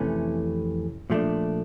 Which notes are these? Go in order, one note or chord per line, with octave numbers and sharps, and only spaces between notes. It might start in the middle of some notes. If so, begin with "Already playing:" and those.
Already playing: F2 C3 E3 A3 C#4
A#2 F3 A3 D4